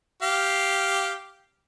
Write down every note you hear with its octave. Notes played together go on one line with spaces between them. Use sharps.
G4 F5